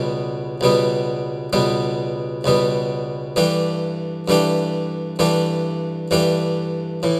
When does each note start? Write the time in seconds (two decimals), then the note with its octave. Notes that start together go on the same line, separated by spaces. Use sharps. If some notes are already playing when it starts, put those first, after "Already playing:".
Already playing: C#2 B2 G3 B3
0.61 C#2 B2 G3 B3
1.53 C#2 B2 G3 B3
2.44 C#2 B2 G3 B3
3.36 G2 E3 A3 D4 G4
4.28 G2 E3 A3 D4 G4
5.19 G2 E3 A3 D4 G4
6.11 G2 E3 A3 D4 G4
7.03 A2 E3